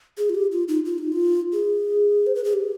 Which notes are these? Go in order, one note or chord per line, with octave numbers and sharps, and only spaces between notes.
G#4
F4
G4
F4
D#4
F4
D#4
F4
G#4
C5
B4
G#4
G4